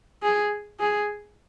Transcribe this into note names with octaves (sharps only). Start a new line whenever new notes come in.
G#4
G#4